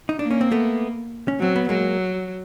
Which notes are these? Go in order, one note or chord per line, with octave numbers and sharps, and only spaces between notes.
D#4
A#3 D4
C#4
C4
A3 B3
C#4
F#3 C4
B3
F#3 G#3 A#3